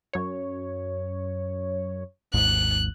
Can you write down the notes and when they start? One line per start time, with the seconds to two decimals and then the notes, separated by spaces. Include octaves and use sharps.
0.13 F#2 C#5
2.34 G#1 D#2 G#2 F#6